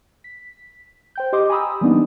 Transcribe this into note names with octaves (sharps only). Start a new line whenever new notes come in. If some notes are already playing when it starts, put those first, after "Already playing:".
B6
C5 G5 G6
G4 D#5 C6 D6 D#6
G#5 A#5 B5 D#6 E6
E3 G3 A#3 B3 D4 D#4